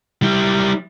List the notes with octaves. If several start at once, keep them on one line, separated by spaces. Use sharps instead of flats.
G3 E4